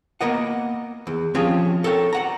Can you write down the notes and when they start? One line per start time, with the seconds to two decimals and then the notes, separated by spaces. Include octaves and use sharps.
0.21 A#3 B3 A#4 D#5 F#5
1.07 E2
1.35 F3 C4 C#4 F4 G4 G#4
1.84 A4 A#4 C#5 G5
2.13 D5 F#5 A#5